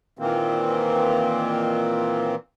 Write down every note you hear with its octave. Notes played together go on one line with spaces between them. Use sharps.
A#2 D#3 E3 A#3 C4